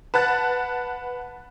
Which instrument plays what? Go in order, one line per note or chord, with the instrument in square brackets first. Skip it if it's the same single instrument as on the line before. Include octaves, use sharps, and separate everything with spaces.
[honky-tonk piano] B4 F#5 A5 F#6 A6